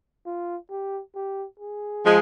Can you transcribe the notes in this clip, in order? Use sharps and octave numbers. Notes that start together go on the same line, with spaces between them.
F4
G4
G4
G#4
F3 G#3